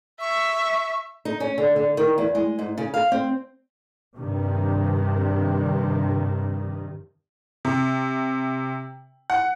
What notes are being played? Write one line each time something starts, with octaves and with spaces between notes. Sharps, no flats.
E5 C#6
D#4
C#4
D3
D3
D#3
E2
G#3
G#2
C#3
F5
C4
G2 C3 D#3
C3
F#5